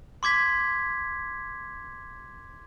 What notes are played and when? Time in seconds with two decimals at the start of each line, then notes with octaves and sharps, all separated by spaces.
0.23 C6 D6 G#6 B6